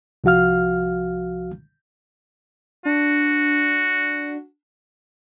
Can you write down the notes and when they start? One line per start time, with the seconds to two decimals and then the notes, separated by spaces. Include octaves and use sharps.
0.24 C2 F3 F#4 F5 F6
2.85 D4 F#4